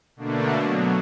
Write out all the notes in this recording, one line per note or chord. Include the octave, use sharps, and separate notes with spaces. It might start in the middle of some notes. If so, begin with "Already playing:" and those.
B2 D3 A3 A#3 D4
B2 F#3